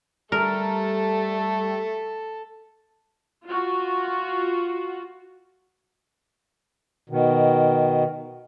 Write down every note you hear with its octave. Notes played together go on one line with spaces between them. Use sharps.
G3 A3 A4 A#4
F4 F#4
B2 D#3